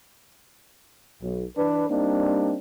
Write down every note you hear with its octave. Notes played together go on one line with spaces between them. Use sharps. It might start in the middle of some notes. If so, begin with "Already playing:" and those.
B1
E3 D4 B4
G3 A#3 C4 D4 D#4